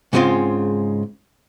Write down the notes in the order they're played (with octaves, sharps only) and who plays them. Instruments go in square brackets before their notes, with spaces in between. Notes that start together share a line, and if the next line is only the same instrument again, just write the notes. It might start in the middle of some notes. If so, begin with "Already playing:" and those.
[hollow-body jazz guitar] G#2 C#3 G#3 C4 F4